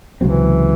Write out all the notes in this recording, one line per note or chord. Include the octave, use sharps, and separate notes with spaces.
C#2 C3 E3 F#3 C4